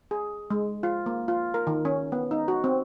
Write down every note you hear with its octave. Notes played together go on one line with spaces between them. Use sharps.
G#4
G#3
F4
A#3
F4
A#4
D#3
C#4
B3
D#4
F#4
C4